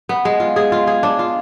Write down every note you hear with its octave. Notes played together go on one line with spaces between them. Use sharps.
B3
G#3
F4
G#4
F4
G#4
D4
F4